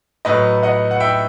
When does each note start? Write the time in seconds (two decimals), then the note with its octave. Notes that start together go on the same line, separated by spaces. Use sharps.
0.25 A2 F#3 B4 D#5
0.63 D#5 F#5
0.91 F#5
1.00 E5 G5